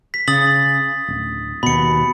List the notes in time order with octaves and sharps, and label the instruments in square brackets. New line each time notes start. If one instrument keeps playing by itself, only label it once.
[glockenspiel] B6
[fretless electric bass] C#3 [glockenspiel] D#6 A6 F#7
[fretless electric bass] D1
[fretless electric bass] D#2 B2 [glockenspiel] B5 C#7